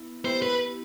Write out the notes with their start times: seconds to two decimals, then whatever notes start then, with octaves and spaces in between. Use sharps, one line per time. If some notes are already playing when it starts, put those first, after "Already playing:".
Already playing: B3 E4
0.24 B3 E4 G4 C5
0.42 B4